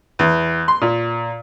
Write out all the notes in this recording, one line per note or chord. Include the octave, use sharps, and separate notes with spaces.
E2
C6
A#2